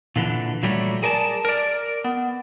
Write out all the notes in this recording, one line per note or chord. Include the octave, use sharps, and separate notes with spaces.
A#2 D3 E3
A#2 F#3 G3 A3
G#4 A#4 D5 A5
A#4 D5
B3